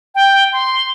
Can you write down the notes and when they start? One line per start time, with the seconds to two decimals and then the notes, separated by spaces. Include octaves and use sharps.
0.15 G5
0.53 C6